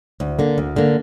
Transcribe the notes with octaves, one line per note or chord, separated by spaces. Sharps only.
D2
D3 A#3
D2
D3 A#3